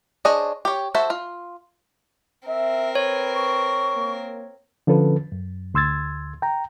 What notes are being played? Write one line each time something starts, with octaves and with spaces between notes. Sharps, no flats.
D4 G#4 C5 C#5 D#5
G4 C#5
F#4 A4 C5 E5
F4
C4 A#4 E5
B4 C#5
C#6
A#3
D3 F3 C#4 A4 B4
F#2
D2 C6 E6 G#6 A6
G5 A#5